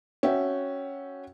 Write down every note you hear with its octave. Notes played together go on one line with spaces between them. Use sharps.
C#4 F#4 E5 G5